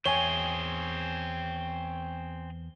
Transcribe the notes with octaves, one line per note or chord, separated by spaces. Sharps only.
E2 C4 G#4 C#5 E5 G5 G#5 G7